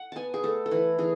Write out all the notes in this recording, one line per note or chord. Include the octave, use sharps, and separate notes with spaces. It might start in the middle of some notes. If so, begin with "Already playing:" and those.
Already playing: F#5
B3 G#5 A5
G#4
A3 A4
A4
E3 B4
E3 G#4